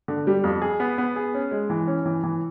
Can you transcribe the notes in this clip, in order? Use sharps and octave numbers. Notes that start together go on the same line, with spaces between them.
D3
G3
F2
G#4
B3
B3
G#4
C#4
G#3
E3
C#4
E3
E3